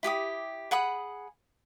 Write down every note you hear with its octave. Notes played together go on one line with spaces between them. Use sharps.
E4 G4 D6 D#6
G#4 F#5 B5 D#6